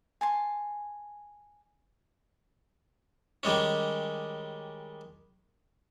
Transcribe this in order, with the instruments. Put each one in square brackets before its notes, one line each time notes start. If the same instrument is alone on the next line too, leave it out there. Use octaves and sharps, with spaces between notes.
[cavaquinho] G#5 A5 C6
[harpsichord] D#3 G3 G#3 C#4